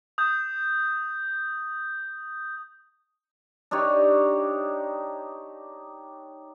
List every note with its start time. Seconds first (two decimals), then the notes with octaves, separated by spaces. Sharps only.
0.18 D#6 G6
3.71 D4 D#4 G4 C#5